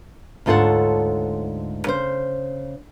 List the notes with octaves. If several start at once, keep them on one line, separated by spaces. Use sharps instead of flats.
D2 G#2 F4 A4 C#5 F#5
C#3 C5